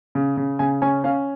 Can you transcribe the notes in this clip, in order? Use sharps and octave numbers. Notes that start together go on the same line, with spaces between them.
C#3
C#3
C#3 G#5
C#4 G#5
C#4 F5